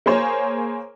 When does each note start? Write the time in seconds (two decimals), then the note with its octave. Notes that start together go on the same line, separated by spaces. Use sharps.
0.06 A#3 G#4 C5 C#5 G#5